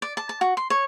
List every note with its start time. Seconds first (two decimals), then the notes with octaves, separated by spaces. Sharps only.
0.02 D5
0.17 A5
0.29 A5
0.41 F#4
0.57 C6
0.70 C#5